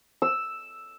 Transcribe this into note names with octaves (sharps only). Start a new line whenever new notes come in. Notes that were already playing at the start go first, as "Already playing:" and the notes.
E6